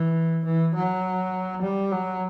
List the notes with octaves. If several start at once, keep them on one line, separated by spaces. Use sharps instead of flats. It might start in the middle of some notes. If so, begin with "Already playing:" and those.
Already playing: E3
E3
F#3
G3
F#3